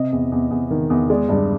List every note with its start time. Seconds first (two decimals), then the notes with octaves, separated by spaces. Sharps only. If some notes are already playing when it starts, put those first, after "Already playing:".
Already playing: C3 D#5
0.13 E2
0.32 E2
0.51 E2
0.71 D#3
0.90 E2
1.10 G#3 D5
1.29 G2 D5